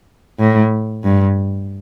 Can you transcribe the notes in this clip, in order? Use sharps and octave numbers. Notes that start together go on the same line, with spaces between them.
A2
G2